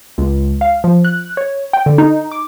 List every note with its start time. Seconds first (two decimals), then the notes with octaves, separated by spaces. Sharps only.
0.18 C#2
0.61 F5
0.84 F3
1.05 F#6
1.37 C#5
1.73 G5
1.86 D3
1.98 D#4
2.31 D6